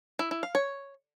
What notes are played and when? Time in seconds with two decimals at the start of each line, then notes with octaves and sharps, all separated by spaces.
0.19 E4
0.31 E4
0.43 F5
0.55 C#5